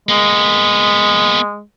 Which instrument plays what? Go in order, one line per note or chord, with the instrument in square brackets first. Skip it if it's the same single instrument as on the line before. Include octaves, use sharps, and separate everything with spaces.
[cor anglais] G#3 [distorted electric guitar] A#3 B3